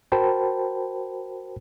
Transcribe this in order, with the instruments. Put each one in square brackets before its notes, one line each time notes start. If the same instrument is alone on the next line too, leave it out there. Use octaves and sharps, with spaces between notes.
[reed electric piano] F#4 A#4 C5 G5 A5 B5